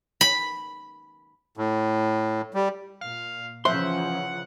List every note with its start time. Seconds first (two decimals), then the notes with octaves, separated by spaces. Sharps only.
0.21 B5
1.57 A2
2.54 G3
3.01 A#2 F5
3.65 C#3 E3 F3 C5 E5 F#5 C6